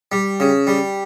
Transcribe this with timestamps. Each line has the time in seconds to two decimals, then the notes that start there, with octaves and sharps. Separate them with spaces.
0.12 G3
0.40 C#3
0.67 G3